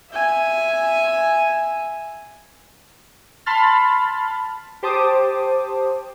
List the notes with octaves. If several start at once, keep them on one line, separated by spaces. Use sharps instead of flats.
E5 G#5
A5 B5 C6 F6 A6
G4 C5 A5 D6 D#6